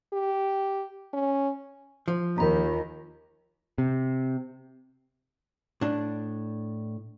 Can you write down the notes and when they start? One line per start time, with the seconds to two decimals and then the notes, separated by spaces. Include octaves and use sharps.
0.13 G4
1.13 C#4
2.08 F3
2.38 D#2 F4 A#4 A#5 B5
3.78 C3
5.81 A2 D4